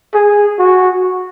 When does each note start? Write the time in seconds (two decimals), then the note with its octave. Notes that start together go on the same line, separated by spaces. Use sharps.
0.14 G#4
0.59 F#4